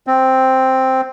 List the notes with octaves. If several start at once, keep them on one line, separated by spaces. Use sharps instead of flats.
C4